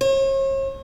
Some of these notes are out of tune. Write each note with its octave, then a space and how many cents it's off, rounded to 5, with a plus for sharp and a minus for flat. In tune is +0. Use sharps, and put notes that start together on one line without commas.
C#5 -45